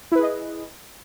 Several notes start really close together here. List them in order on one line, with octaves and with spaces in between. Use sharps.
E4 B4 G#4 D#5